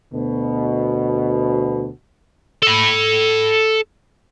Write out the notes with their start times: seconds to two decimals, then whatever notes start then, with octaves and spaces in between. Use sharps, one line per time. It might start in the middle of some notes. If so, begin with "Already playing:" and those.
0.13 D2 B2
2.62 A4 B5